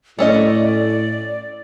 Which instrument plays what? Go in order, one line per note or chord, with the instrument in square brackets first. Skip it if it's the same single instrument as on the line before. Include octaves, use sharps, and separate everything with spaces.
[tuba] A2 [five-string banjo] A3 C#4 D#5 [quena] D5